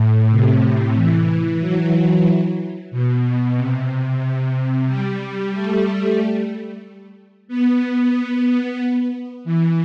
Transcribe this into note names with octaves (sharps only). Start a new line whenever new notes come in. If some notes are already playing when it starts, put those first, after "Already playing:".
Already playing: A2
C3
E3
F#3
B2
C3
C3
G3
A3
B3
E3